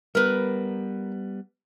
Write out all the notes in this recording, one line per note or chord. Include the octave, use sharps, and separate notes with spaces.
G3 B3 A#4 B4